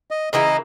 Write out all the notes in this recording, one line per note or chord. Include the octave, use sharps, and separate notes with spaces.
D#5
C#3 E3 A#3 E4 D#5